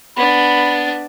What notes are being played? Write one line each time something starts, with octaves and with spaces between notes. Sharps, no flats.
B3 D4 B5